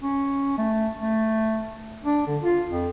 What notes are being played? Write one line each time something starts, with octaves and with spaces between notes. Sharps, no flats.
C#4
A3
A3
D4
D3
F4
F2